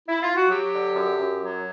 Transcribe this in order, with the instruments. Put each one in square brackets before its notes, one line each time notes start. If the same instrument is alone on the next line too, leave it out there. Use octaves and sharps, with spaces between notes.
[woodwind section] E4
F4
F#4
F#3 G4
D3
F#2
F#2
F#3